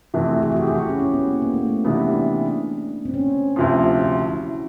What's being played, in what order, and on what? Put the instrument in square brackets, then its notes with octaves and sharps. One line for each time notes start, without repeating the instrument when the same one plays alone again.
[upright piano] F2 C3 E3 A3
[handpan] F#4
G#4
F#4
G4
F#4
E4
C#4
C#4
B3
A#3
A#3
A3
A#3
[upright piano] C3 E3 G3 B3 [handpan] D4
[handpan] D#4
D4
C4
C#4
[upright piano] D2 C3 F3
[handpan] F#4
F#4
E4